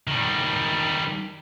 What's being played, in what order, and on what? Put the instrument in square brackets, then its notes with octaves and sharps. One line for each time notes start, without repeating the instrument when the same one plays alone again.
[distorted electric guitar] D#3 G3